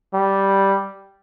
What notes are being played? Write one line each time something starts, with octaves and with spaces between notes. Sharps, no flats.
G3